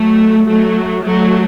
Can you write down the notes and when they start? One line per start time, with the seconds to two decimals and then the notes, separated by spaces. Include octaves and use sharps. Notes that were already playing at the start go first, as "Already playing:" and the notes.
Already playing: F#3 A3
0.48 F#3 A3
1.04 F#3 A3